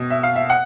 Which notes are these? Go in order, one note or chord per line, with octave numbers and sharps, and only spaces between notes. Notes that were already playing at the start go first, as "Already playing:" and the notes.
Already playing: B2 D#5
E5
F5
E5
F#5